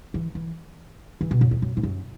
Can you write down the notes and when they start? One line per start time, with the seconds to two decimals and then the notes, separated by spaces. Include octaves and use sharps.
0.14 E3
0.35 E3
1.21 E3
1.31 B2
1.41 F#2
1.51 E2
1.62 F#2
1.77 G#2
1.83 F#2